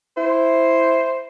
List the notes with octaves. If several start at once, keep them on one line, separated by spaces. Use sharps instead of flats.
E4 C5